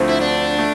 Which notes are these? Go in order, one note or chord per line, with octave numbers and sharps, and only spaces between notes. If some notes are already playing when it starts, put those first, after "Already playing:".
Already playing: D2 D3 F3 A3 C4
E4
D4
A3